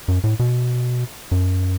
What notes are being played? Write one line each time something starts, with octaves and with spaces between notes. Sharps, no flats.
F#2
A2
B2
F#2